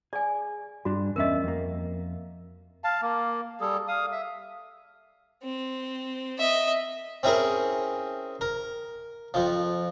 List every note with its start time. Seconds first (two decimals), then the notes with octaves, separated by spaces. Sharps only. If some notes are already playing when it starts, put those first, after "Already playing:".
0.13 G#4 D5 G#5
0.85 G2 G3 D4 F#4
1.16 E2 C#4 A#4 D#5 E5
1.44 F2 A#3
2.84 F5 A5
3.02 A#3
3.61 G3 G#4 A4
3.88 F5 D#6
4.12 E5
5.43 C4
6.38 D#5 E5
7.23 C4 C#4 E4 G#4 A#4
8.41 A#4
9.34 F2 F3